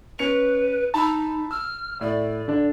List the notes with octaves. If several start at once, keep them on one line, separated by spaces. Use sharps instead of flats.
C#4 B4 C#7 F7
D#4 A5 B5 E6
E6 F6
A2 D5
D3 D4